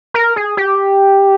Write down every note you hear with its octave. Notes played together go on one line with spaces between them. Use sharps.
A#4
G#4
G4